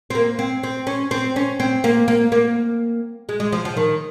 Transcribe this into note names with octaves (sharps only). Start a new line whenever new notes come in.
C4
A#3
C4
C4
C#4
C4
C#4
C4
A#3
A#3
A#3
G#3
G#3
F3
F3
D#3